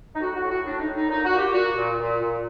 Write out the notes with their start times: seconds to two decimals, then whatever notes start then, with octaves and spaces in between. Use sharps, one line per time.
0.15 D#4
0.21 A2 F#4
0.36 F#4
0.42 A2
0.50 F#4
0.64 A2 D4
0.79 D#4
0.87 A2
0.95 D#4
1.09 A#2 D#4
1.25 F#4
1.32 A#2
1.39 G4
1.54 A#2 F#4
1.77 A#2
1.98 A#2
2.20 A#2